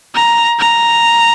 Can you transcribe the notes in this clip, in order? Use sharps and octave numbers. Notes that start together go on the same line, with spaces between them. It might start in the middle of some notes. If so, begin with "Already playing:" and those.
A#5
A#5